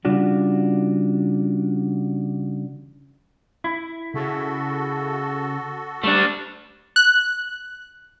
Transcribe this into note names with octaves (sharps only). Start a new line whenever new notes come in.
C#3 E3 G3 D4 F4 F#4
E4
C#3 F#4 A4
G3 A3 D4
F#6